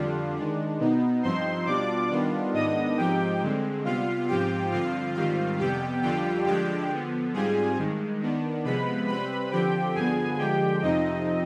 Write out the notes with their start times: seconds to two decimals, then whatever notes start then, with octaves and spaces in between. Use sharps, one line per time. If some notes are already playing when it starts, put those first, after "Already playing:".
Already playing: F2 D3 G3 D4 F4
0.36 D#3 G#3 D4
0.80 B2 B3 D#4
1.23 G2 F3 C4 D#4 C5 C6
1.66 B2 G3 D4 F4 D5 D6
2.10 D#3 G3 B3 D4 F4
2.53 G#2 D#3 B3 D4 D#5 D#6
2.97 G#2 F3 C4 D#4 G4 G5
3.41 G2 D3 G#3 C4
3.84 C3 G3 B3 F4 F5
4.28 G#2 F3 C4 F4 G4 G5
4.71 G2 D3 F3 C4 F4 F5
5.15 G#2 D#3 G3 C4 F4 F5
5.59 F2 C3 G3 B3 G4 G5
6.02 F2 D3 G3 D4 F4 G4 G5
6.46 G2 D3 F3 G#3 D4 G4 G5
6.90 D3 F3 B3
7.33 G#2 G3 C4 F4 G#4 G#5
7.77 G2 D#3 G#3
8.21 D#3 B3 D4
8.64 C3 F3 G#3 B3 B4 B5
9.08 C3 G3 C4 B4 B5
9.51 D3 F3 C4 G4 G5
9.95 G2 D3 F3 B3 G#4 G#5
10.38 D3 F3 G#3 G4 G5
10.82 F2 C3 F3 C4 D#4 D#5